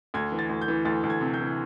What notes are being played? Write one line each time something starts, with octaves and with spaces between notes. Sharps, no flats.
D2 G#6
E3
A6
D2
G6
E3
D2 A6
D2
G#6
C3
G6
E3